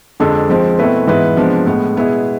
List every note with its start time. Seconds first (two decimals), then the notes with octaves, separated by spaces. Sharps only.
0.20 F2 D3 G#3 D4 A4
0.50 F3 G#3 C4
0.79 B2 A3 C4 E4 B4
1.07 G#2 E3 B3 E4 B4
1.37 C3 F3 G#3 B3 D4
1.66 A2 G#3 B3
1.96 B2 G#3 B3 E4 G#4